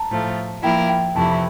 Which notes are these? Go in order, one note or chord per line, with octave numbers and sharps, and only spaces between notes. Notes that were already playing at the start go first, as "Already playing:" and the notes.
Already playing: A5 A#5
A2 F3 A3
F3 A#3 E4 A#4 G5
G5
F2 C3 E3 A3 E4 A5